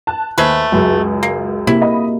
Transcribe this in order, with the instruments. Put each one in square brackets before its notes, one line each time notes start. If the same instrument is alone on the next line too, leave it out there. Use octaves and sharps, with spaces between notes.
[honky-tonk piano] A5 F#6
[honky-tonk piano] D#2 C5 [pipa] G#3 A3 B4
[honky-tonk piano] C#2 F#2 [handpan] F#4 G#4
[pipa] A#3
[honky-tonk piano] C3 [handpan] A#3 C4 G4 [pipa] E4
[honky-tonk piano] D#5 B5